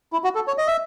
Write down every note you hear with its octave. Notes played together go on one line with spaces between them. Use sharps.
E4
F#4
A4
C#5
D#5
E5